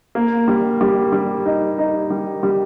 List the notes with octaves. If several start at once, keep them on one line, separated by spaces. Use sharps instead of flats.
A#3
G3
G3
G3
D#4
D#4
G3
G3